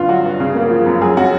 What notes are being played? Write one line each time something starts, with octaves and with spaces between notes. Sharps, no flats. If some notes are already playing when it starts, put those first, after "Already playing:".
Already playing: G2 D3 F4
F#3 F#4
G2
C#3
A#3
F3
F#2
F#3 G#4
C#4 F#4